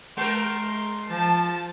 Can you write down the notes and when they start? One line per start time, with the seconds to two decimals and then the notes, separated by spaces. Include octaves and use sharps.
0.17 G#3 A#4 C6
1.10 F3 F4 A5